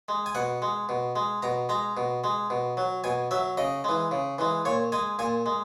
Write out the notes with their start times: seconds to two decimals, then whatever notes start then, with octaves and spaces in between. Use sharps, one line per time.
0.09 G#3
0.26 G#5
0.35 B2 F#5
0.62 G#3
0.89 B2
1.16 G#3
1.43 B2 A#5
1.69 G#3 A#5
1.97 B2
2.24 G#3
2.50 B2
2.77 F#3
3.04 B2 G#5
3.31 F#3 E5
3.57 C#3 D#5
3.84 E3 G#3
4.11 C#3
4.38 E3 G#3
4.65 A#2 C#5
4.92 G#3 G#5
5.19 A#2 G#5
5.46 G#3